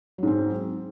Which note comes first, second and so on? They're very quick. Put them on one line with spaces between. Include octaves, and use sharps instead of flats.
F#3 G#2 C4